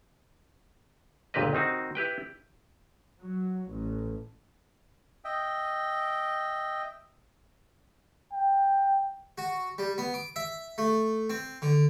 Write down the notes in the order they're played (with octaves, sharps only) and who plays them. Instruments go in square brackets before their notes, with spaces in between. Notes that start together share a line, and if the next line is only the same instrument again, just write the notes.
[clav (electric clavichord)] G1 C#2 A#2 G4 B4 D#5
D#3 C4 D#4 F#4
E4 G4 B4 G5
[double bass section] F#3
A1
[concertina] D#5 E5 G5
[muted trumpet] G5
[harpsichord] F#4
G3
B3
D6
E5
A3
C4
D3